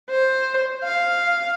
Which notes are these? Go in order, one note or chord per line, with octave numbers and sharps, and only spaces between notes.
C5
F5